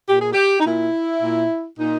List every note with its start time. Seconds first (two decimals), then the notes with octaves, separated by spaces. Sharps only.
0.09 A#2 G4
0.21 G#4
0.33 G4
0.60 D#4
0.65 A#2 E4
1.21 A#2
1.78 A#2 D#4